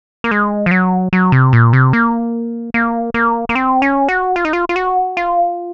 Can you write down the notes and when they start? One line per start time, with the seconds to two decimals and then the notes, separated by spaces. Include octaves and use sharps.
0.24 A#3
0.31 G#3
0.66 F3
0.71 F#3
1.13 F#3
1.32 C3
1.53 A#2
1.73 C3
1.93 A#3
2.74 A#3
3.14 A#3
3.49 A#3
3.55 C4
3.82 C#4
4.09 F#4
4.36 F4
4.45 D#4
4.53 F4
4.69 F4
4.76 F#4
5.17 F4